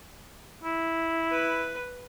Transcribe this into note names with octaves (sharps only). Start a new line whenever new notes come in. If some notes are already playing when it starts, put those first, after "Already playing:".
E4
B4